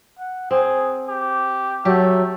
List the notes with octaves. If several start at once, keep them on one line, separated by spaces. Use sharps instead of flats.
F#5
C4 G#4
G4
F#3 A3 G4